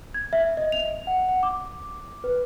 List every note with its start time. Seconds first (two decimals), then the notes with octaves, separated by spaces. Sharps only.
0.14 G#6
0.33 E5
0.57 D#5
0.72 F7
1.07 F#5
1.29 F#5
1.43 D6
2.24 B4